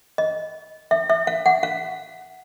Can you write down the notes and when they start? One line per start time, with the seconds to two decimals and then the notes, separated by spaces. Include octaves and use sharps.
0.18 D#5
0.91 E5
1.10 E5
1.27 F5
1.46 F#5
1.63 F5